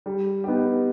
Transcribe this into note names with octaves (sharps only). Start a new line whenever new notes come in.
G3
B3 D#4 G4